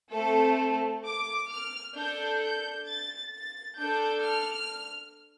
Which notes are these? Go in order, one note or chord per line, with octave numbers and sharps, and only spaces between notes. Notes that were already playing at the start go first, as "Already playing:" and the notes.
A3 C4 A4
D6
F6
D4 A4 G6
G6
A6
A6
D4 A4 G6
F6